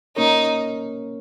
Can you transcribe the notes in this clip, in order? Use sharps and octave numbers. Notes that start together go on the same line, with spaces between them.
A#3 C#4 D#4 A#4 C#5